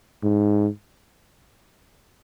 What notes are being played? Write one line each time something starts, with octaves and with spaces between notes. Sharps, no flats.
G#2